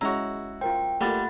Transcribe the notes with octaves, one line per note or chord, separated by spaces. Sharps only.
G#3 C#4 E4 F#4 A#5
F4 A#4 C5 G5
G3 A3 A#3 F4 F#5 B5 A6